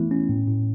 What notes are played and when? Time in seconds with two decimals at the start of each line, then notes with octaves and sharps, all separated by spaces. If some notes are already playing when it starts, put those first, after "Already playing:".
Already playing: E3 A3 B3 E4
0.11 C#4
0.29 A2
0.47 A2